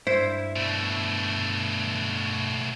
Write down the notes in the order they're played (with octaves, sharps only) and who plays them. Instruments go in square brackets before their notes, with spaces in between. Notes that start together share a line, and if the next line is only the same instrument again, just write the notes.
[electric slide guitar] G2 E4 [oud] C5
[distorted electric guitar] B2 A3